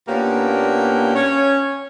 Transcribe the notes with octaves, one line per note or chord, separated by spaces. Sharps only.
A#2 A#3 B3 C#4 D4 G4
C#4 C#5